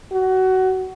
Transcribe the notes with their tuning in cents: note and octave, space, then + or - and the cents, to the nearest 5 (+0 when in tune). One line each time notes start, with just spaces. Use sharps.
F#4 +20